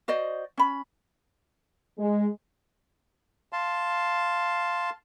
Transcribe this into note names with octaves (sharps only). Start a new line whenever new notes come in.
F#4 C5 D5 D#5
C#4 B5
G#3
F5 A5 C6